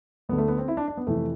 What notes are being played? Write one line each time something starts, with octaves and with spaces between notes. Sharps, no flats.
D2 D3 B3
A3
B3
C4
E4
D4
D4
B3
F2 C3 E3 A3